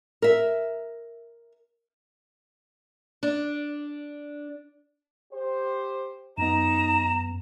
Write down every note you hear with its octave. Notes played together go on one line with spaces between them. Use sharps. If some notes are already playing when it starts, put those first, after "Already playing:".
A#4 E5
D4
G4 C5
F#2 B3 D#4 A#5 E7